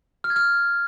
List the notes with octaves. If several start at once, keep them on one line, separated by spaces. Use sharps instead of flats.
F6
G#6
F6